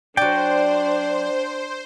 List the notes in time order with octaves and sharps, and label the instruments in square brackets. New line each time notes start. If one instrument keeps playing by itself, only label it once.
[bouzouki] F#3 D5 [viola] D4 [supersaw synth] C5 [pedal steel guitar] G5